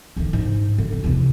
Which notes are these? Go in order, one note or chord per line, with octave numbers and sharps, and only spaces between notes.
D3 D#3
G#2
D3
C4
E2 C3